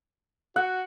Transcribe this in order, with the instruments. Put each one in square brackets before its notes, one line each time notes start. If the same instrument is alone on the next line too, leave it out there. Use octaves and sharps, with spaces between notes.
[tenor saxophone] F#4 [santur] F#5